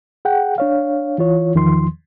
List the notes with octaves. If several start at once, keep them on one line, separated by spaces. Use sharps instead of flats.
G#4 F#5 G5
D4 C#5 F5
E3 F4 C#5
E2 D#3 F3 C6